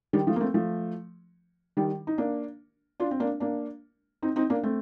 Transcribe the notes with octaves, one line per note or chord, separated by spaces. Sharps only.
D#3 G3
F3 A3
A#3
A3 C4
F3 A3
D#3 G3
D#4
A#3 D4
D4 F4
C4
A#3 D4
A#3 D4
C4 D#4
C4 D#4
A#3 D4
A3 C4